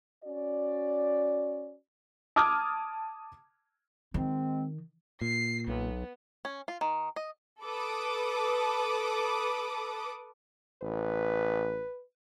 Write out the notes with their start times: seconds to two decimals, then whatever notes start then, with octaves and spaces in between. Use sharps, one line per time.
0.24 C#4 F#4 D5
2.36 A5 D6 D#6 F6 G#6
4.14 G#2 D#3 G#3 C4
5.21 A#2 C7
5.68 B1 B3
6.45 C#4
6.68 F4
6.81 D#3
7.16 D#5
7.63 A4 B4 D6 D#6
10.82 A1 B4